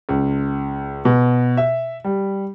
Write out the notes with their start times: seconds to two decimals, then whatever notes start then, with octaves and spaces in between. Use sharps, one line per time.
0.09 C#2
1.05 B2
1.57 E5
2.04 G3